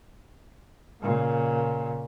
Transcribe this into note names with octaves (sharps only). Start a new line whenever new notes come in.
A#2 C#3